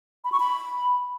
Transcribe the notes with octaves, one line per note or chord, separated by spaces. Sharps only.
B5
C#6
B5